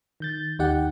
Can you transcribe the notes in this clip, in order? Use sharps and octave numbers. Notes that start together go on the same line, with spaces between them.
D#3 G6 A6
D#2 D#4 G4 F#5